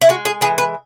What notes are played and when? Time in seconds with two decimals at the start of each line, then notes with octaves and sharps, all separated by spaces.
0.01 E4
0.09 G#3 F#4
0.25 G#4
0.41 E3 G#4
0.58 B4